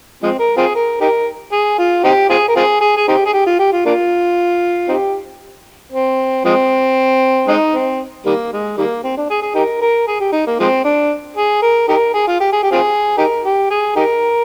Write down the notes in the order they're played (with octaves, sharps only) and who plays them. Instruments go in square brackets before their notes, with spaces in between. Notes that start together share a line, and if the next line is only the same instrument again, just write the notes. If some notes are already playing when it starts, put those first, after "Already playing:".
[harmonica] F3 G#3 C4
A#4
C4 F4 G#4
A#4
D#4 G4 A#4
G#4
F4
C4 D#4 G4
C4 F4 G#4
A#4
C4 F4 G#4
G#4
G#4
C4 D#4 G4
G#4
G4
F4
G4
F4
A#3 D4 F4
C4 D#4 G4
C4
F3 G#3 C4
G#3 C4 D#4
C4
D#3 G3 A#3
G#3
D#3 G3 A#3
C4
D4
G#4
G#4
D#4 G4 A#4
A#4
G#4
G4
D#4
A#3
F3 G#3 C4
D4
G#4
A#4
D#4 G4 A#4
G#4
F4
G4
G#4
G4
C4 F4 G#4
D#4 G4 A#4
G4
G#4
D#4 G4 A#4